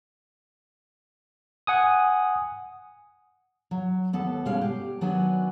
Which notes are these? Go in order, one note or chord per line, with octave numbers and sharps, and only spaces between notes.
F#5 G#5 D#6
F#3
D#2 B3 A4
B2 G3 G#3 C#4 F5 G#5
G4
D#3 F#3 B3 D4 F#4 G#5